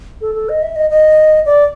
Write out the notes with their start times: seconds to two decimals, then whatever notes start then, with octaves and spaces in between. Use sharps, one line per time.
0.21 A4
0.35 A4
0.49 D#5
0.62 E5
0.76 D#5
0.90 D#5
1.46 D5